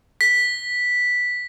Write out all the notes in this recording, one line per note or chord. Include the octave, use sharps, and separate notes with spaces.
B6